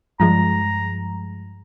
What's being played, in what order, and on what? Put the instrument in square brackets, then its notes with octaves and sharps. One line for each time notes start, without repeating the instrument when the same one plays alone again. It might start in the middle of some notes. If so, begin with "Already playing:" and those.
[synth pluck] G2 F3 G#3 [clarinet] A#5